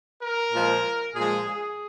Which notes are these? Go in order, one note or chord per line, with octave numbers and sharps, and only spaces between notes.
A#4
A#2 F3 G#3
A#2 F3 G#3 G#4
G#4